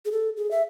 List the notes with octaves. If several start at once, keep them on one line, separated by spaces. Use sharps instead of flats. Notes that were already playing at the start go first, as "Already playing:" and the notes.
G#4
A4
G#4
E5